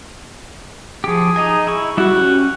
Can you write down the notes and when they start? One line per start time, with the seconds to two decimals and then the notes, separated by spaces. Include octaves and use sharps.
1.04 F3 G4 G#4
1.36 D#4 D#5 G#5
1.67 E4 C#6
1.97 G3 E4 F#4
2.16 C#4 G4